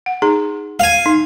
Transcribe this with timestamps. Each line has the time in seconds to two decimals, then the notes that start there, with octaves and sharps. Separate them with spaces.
0.06 F#5
0.22 D#4 G#4 A#5
0.80 F5 G#5
1.06 D#4